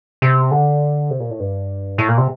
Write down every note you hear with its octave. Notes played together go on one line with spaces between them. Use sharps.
C3
D3
C3
A#2
A2
G2
A2
A#2
C3